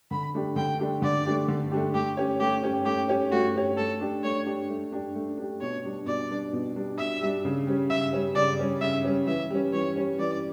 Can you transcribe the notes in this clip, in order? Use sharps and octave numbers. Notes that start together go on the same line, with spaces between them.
D3 B5
A3 D4 G4
D3 G5
A3 D4 G4
D3 D5
A3 D4 G4
D3
A3 D4 G4
A3 G4
C#4 G4 C#5
A3 G4
C#4 G4 C#5
A3 G4
C#4 G4 C#5
A3 F#4
C#4 G4 C#5
A3 A4
D4 G4
A3 C#5
D4 G4
A3
D4 G4
A3
D4 G4
B2 C#5
G3 D4
B2 D5
G3 D4
B2
G3 D4
B2 E5
G3 D4
C#3
G3 C#4
C#3 E5
G3 C#4
C#3 D5
G3 C#4
C#3 E5
G3 C#4
E3 E5
G3 C#4
E3 C#5
G3 C#4
E3 D5